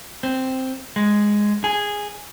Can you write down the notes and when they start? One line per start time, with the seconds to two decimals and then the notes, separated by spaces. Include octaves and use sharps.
0.23 C4
0.96 G#3
1.64 G#4